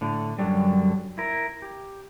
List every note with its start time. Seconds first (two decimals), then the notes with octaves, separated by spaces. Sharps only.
0.01 A2 D3
0.39 F#2 B2 D3 F#3 G3
1.18 E4 A#4
1.62 G4